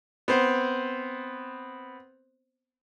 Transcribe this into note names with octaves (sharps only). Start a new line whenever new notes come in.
B3 C4 C5